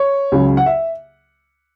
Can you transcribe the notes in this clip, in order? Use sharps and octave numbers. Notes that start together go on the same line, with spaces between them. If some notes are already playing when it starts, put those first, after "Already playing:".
Already playing: C#5
C#2 C#3 F#3
F#5
E5